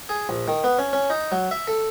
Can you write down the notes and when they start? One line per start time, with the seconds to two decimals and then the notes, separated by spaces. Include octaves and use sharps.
0.09 G#4
0.29 A#1
0.48 D#3
0.64 B3
0.79 C#4
0.93 C#4
1.10 D#4
1.32 F#3
1.51 E5
1.67 A4